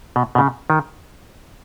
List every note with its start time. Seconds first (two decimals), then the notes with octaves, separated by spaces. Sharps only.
0.16 B2
0.35 B2
0.38 C#3
0.70 D#3